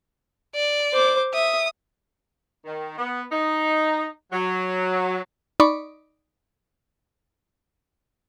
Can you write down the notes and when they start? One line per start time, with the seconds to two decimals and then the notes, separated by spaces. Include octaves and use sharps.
0.54 D5
0.93 C5 D6
1.34 E5 D#6
2.65 D#3
2.98 B3
3.31 D#4
4.33 F#3
5.60 D#4 D5 B5 C#6 D6